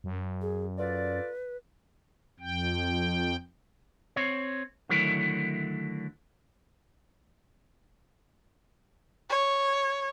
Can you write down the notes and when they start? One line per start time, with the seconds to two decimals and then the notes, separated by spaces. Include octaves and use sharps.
0.04 F#2
0.42 G#4
0.78 F4 A4 B4 D5
2.40 F2 G5
4.16 C4 C#5
4.89 D3 D#3 F#3 A3 E4 A#4
9.30 C#5